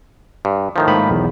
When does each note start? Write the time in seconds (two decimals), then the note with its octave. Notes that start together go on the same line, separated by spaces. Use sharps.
0.45 G2
0.76 A2 D#3 F3
0.88 G#2 A#3 B5
1.10 B1 E2